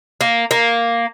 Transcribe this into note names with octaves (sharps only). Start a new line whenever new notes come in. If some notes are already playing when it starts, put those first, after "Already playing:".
A#3
A#3